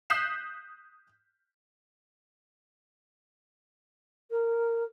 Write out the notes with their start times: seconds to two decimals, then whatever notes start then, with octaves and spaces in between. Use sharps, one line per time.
0.10 D#6 F#6 G6 B6 C7 E7
4.31 A#4